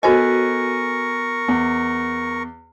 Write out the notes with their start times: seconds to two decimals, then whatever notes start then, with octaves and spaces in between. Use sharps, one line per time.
0.03 B3 F#4 A4 A#4 C5 D#5 G#5 C#6
1.48 E2